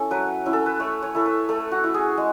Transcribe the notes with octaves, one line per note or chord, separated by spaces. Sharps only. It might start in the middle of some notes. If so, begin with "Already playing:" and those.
Already playing: C#4 E4 A4
F#3 B4
C#4 E4
A4
B4
A3 C#5
C#5
E4 A4
B4
A3 A4
F#4
E4
G#4
G#3